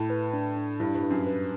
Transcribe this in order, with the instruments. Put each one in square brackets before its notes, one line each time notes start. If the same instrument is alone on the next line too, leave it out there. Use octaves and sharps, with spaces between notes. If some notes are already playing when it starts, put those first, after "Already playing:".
Already playing: [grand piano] A2 [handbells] E4
[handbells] B4
D4
D4
[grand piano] G2 [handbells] E4
[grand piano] G2
[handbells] B4
[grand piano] F#2
[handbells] B4